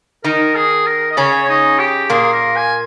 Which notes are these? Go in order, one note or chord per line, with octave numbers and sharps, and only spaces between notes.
D#3 D#4 A#4
G#4
A#4
D#5
C#3 C#4 C#5
D#4
G4
A#2 A#3 G#4
A#4
G#5